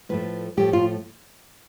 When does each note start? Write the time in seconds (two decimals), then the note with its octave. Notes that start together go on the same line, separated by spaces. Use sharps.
0.09 A2 F3 A3 B4
0.57 A2 F3 A3 G4
0.73 F4